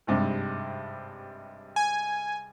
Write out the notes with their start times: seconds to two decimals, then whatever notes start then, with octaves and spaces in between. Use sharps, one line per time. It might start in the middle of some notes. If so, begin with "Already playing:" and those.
0.07 G#1 G2 C3
1.76 G#5